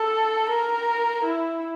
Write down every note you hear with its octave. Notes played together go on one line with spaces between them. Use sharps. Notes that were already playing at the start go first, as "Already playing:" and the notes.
Already playing: A4
A#4
E4